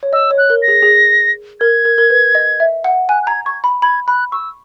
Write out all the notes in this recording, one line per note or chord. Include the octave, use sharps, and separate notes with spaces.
C#5
D#5 E6
C#5
F#6
A#4
A#6
G#4
G#4
A#4 G#6
A#4
A#4
B4
D#5
E5
F#5
G#5 F#6
F#6
A#5 G#6
C#6 G#6
B5
B5 G#6
B5 F#6
C#6 E6